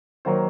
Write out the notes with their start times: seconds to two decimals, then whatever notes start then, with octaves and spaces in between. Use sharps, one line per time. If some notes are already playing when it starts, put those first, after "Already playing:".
0.25 D#3 F#3 A#3 C5